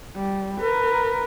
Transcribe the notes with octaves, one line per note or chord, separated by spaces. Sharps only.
G3
A#4 B4